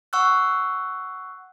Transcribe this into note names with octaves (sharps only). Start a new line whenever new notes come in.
F#5 C#6 E6 F#6